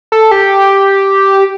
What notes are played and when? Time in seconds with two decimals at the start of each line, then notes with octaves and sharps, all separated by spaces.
0.12 A4
0.31 G4